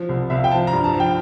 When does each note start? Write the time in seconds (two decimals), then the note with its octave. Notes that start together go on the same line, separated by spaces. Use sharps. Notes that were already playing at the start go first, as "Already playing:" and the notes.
Already playing: F3
0.09 C2
0.30 C2 E5
0.37 F5
0.44 G5
0.51 F3 A5
0.67 A#5
0.73 G2
0.84 A5
0.94 F3
1.00 G5